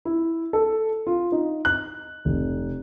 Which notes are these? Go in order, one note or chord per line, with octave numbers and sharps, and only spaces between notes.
E4
A4
F4
D#4
F#6
F1